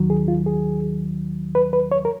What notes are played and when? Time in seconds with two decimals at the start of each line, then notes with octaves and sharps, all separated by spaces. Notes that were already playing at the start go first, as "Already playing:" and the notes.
Already playing: D#2 D#3 F#3
0.10 G#4
0.28 F4
0.46 G#4
1.55 B4
1.73 B4
1.92 C#5
2.05 A#4